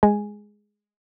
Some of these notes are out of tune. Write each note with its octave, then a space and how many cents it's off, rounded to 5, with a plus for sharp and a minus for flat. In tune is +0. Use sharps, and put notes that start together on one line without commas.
G#3 +0 G#5 +0